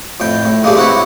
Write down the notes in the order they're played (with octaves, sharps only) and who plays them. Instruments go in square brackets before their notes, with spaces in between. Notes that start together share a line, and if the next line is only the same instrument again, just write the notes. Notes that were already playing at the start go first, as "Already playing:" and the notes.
[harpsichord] F2 A2 G5
A2
C#3 G#3 A#3 D4 G4
C4 E4 F#4 B4 C#5